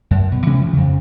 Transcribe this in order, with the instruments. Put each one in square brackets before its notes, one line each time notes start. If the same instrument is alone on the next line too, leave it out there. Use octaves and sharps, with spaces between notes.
[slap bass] F#2
B2
C3 E3 G#3 C#4
F3
F2 C#3